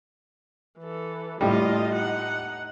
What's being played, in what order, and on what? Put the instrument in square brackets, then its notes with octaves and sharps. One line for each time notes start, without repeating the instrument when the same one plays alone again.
[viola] E3 A4
[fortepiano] A2 G3 [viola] F4 D#5
[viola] D#4 F#5